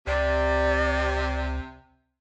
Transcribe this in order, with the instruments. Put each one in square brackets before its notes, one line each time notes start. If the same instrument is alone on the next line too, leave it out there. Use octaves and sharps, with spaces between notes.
[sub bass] C#2 [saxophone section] C3 [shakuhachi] D5